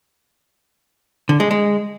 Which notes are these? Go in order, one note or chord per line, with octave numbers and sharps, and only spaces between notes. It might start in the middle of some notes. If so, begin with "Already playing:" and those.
D3
G#3
G#3